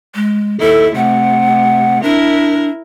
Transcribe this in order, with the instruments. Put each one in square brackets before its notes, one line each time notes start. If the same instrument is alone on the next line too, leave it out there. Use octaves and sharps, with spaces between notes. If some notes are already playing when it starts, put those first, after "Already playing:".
[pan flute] G#3
[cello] D#2 E4 [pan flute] A4
[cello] C3 A3 [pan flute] F#5
[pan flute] D4 [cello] E4 A#4